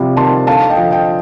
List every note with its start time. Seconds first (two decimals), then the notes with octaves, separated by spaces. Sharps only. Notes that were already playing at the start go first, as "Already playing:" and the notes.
Already playing: C3 F3 G3
0.17 D#3 A5 C6
0.47 D3 F5 A5
0.70 D#5 G5
0.77 F3
0.92 D#5 G5